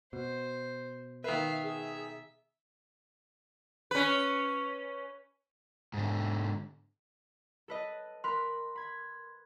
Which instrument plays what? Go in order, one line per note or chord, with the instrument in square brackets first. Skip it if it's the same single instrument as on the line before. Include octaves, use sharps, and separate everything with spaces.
[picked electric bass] B2 [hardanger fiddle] C5
[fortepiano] D#3 B4 [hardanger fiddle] E5 F5
[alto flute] G#4 [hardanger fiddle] E5
[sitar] C#4 B4
[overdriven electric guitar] G#2 D3
[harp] A4 B4 D#5
[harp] A#4 B5 F#6 [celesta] C6
[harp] B5 G#6